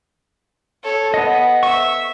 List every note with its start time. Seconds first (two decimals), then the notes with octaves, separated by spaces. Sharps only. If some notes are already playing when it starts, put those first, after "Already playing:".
0.83 A4 C#5
1.14 B3 D#5
1.63 E5 C#6